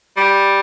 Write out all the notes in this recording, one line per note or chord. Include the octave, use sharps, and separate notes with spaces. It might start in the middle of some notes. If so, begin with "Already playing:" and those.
G3